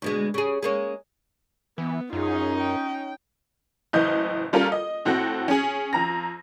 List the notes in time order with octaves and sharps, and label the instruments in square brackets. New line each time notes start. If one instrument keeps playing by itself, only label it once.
[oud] D2 B2 G#3
C#3 G#4
G#3 A#3 C#4
[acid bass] E3 [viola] B3
[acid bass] F#2 [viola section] C#4 D#4 [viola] F4 G#4
[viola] G5
[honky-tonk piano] F#1 A2 E3 D#5 G6
G3 C#4 F4 A4 A#4
D#5
A2 C4 F#4 A4 F#5 A#6
C#4 G#4
F2 A#5 A#6